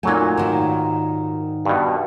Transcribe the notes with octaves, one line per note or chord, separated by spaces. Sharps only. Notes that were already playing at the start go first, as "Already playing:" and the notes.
A#2 F#3 A3 D#4 G#5
G#2 D#3
G2 B2